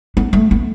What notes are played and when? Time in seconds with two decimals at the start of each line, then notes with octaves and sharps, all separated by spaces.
0.17 B3
0.33 A3
0.51 B3